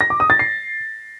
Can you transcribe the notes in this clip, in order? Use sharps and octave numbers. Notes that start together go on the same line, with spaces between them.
A#6
D6
D#6
A6
C7